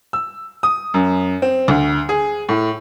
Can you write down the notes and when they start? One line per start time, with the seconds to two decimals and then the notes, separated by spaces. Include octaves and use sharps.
0.13 E6
0.63 D#6
0.94 F#2
1.42 C4
1.68 D2
2.09 G#4
2.49 A2